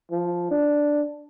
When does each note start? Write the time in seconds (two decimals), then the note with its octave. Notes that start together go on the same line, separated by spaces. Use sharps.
0.11 F3
0.51 D4